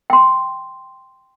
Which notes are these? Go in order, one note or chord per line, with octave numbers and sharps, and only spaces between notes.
G5 C6